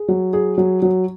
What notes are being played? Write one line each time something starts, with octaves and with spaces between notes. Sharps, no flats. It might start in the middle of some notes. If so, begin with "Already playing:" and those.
Already playing: G#4
F#3
G#4
F#3
F#3